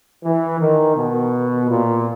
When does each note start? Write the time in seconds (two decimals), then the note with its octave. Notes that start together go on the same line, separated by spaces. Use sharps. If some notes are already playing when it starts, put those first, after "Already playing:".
0.24 E3
0.60 D#3
0.97 B2
1.70 A#2